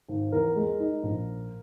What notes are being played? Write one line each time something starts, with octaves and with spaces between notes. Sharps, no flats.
G#1
E2 A#4
G#3
D#4
A#1